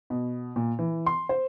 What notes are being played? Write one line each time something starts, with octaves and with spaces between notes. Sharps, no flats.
B2
A#2
E3
C6
C5